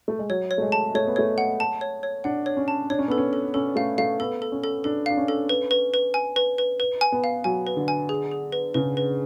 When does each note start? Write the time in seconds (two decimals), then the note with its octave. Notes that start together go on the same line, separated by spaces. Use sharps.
0.08 A3
0.19 G#3
0.30 F#3 C#5
0.51 C#5
0.58 A3
0.62 G#3
0.72 A5
0.95 A3 C#5
1.07 B3
1.16 A3 C#5
1.38 F#5
1.60 A5
1.81 C#5
2.03 C#5
2.24 D4 F#5
2.46 C#5
2.57 C#4
2.68 A5
2.90 D4 C#5
2.99 C#4
3.08 B3 A4
3.18 C#4
3.33 A4
3.54 C#4 A4
3.76 A3 F5
3.98 A3 F5
4.19 B3 A4
4.42 A4
4.52 C#4
4.64 A4
4.84 D4 A4
5.06 D4 F5
5.17 C#4
5.28 A4
5.49 B4
5.71 B4
5.94 B4
6.14 G#5
6.36 B4
6.58 B4
6.80 B4
7.01 G#5
7.12 B3
7.24 F5
7.44 F#3 G#5
7.67 B4
7.77 D3
7.88 G#5
8.09 G#4
8.32 G#4
8.52 B4
8.74 C#3 B4
8.97 B4